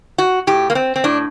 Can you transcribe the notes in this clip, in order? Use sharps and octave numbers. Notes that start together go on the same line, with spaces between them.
F#4
A2 G4
A#3
C4
C4
A2 D4